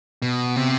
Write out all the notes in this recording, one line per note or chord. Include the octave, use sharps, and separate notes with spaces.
B2
C3